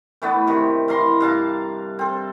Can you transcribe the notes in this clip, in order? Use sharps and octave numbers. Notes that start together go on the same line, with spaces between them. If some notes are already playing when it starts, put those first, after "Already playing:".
E3 A3 B3 D4
C3 D#3
E3 F5 A#5 C6
G2 F5 A5 A#5
C4 A4